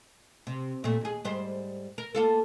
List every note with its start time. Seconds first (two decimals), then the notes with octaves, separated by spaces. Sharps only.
0.47 C3
0.84 A#2 A3
1.01 D#2 G#4
1.25 G#2 G3 C5
1.98 A#4
2.15 A#3 F4 A4